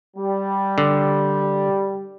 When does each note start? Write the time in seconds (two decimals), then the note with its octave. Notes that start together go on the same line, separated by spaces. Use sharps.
0.16 G3
0.78 D3